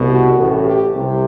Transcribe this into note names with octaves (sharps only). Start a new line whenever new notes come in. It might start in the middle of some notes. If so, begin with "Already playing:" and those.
Already playing: C2 B2
F#4
A1 A2 E3
G4
C2 C3 G4